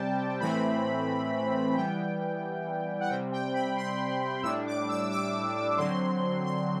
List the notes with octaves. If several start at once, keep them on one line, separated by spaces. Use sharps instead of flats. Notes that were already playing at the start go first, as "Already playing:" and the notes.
Already playing: C3 G3 C4 G5 A5
A2 E3 A3 C4 B5
E3 G3 B3 G5
F#5
C3 G3 C4 G5
G5
B5
C6
A2 G3 D4 E6
D6
E6
D6
D3 F#3 C4 C6
C6